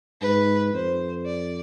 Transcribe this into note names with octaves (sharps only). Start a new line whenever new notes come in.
G#2 B4
F2 C5
D5